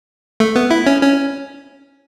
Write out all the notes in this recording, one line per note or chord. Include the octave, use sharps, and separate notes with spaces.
A3
B3
E4
C#4
C#4